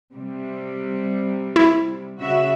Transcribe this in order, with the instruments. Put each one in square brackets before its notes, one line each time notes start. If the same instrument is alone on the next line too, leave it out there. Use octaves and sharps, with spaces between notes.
[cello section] C3 G3
[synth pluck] E4
[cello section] C#3 F#4 E5